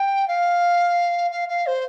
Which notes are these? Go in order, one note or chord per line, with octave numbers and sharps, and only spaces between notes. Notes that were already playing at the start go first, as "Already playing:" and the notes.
Already playing: G5
F5
F5
F5
C5